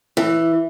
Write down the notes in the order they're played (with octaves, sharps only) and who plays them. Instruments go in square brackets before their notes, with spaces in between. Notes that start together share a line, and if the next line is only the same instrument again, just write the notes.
[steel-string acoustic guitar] E3